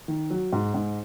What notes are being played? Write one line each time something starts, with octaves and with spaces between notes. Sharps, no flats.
D#3
F#3
G#2
G#2